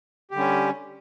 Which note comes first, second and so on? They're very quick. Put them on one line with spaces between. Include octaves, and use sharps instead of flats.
G4 D3 G3 C#4